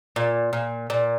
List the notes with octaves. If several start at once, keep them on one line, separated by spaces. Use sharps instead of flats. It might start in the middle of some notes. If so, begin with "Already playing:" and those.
A#2
A#2
A#2